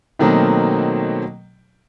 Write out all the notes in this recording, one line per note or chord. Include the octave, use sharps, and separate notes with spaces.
B2 D#3 F#3 A3 A#3 C4